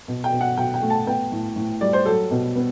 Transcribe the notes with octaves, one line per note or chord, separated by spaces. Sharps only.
B2
G5
B2
F#5
B2 G5
G5
A3
A5
B3 G5
A2
A2
G3 D5
C5
F#3 A4
B2
B3